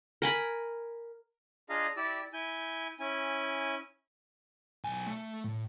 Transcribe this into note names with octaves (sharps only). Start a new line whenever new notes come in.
A#4 G#5 B5
D4 F4 G#4 D#5 F5 A#5
E4 G4 D5 E6
E4 G#5 G6
C#4 E4 G#5
B1 G#5
A3
A2